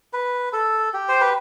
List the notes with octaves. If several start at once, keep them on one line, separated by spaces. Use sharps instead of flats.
B4
A4
G4
C5
B4